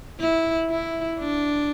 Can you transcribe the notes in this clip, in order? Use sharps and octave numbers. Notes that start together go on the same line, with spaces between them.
E4
E4
D4